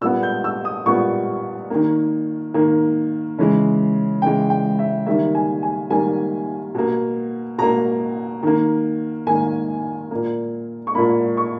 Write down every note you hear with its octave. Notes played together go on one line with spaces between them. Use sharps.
A#2 G3 B3 E6
G6
E6
D#6
A#2 G3 B3 C#6
D#3 A#3
D#3 A#3
C#3 E3 G#3
C#3 E3 G#3 G5
G5
E5
D#3 G3 A#3 E5
G#5
G#5
D#3 G3 A#3 G#5
B2 A#3
B2 A#3 A#5
D#3 A#3
D#3 A#3 G#5
A#2 A#3
C#6
A#2 A#3 B5
C#6